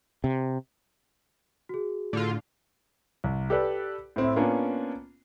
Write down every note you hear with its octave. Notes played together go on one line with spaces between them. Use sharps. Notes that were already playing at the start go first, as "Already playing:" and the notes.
C3
F#4 G#4
A2 D3 F4
C2
G4 A4 B4 D5
A2 C4 E4
A#3 B3 C#4 D4 F4